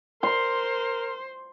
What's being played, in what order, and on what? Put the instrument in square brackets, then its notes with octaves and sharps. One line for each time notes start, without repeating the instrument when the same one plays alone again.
[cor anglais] A#4 [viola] C5 [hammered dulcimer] C6